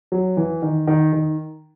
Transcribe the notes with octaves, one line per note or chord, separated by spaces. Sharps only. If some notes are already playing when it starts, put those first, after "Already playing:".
F#3
E3
D#3
D#3
D#3